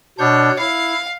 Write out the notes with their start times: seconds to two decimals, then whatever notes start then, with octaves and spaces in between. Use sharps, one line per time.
0.19 B2 D4 C#5 G6
0.59 E4 F5